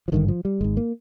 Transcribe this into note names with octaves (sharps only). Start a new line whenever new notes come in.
F3
G#1 G2 D3 D#3
F3
G3
G#1 G#2 G#3
A#3